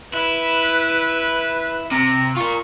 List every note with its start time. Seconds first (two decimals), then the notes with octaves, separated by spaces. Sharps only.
0.14 E4 B4
1.91 C3 A#5
2.36 F4 A#4 C#6